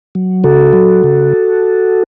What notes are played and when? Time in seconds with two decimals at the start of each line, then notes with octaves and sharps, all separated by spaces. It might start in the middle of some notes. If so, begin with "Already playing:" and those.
0.15 F#3
0.44 C#3 F#4 A4
0.73 F#3
1.04 C#3